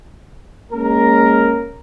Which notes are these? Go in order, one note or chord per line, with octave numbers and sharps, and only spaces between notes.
G#3 A#3 C#4 A#4